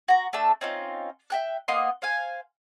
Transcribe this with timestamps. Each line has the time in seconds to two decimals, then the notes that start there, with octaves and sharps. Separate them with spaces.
0.08 F#4 A#5
0.33 A3 D4 A5 E6
0.61 C4 C#4 D#4 F4
1.30 E5 G5 F#6
1.68 A#3 B3 D#5 C6
2.02 C5 F5 G#5